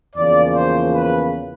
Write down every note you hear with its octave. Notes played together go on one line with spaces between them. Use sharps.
E2 C#3 F3 A#3 D5
C5
B4